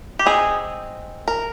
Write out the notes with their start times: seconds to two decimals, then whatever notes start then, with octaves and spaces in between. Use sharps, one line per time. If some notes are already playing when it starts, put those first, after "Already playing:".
0.19 G4
0.25 G#3 C4 D#4 G#4
1.28 A#4